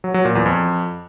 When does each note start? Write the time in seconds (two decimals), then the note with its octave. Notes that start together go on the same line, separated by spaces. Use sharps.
0.04 F#3
0.14 F#3
0.25 A#2
0.35 E2
0.46 F2